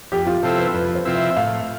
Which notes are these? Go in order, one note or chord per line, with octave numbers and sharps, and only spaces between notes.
F2 G4
F4
C3 F3 C4 E4 A4
B4
F2 B4
C5
C3 F3 C4 E4
E5
A2 F5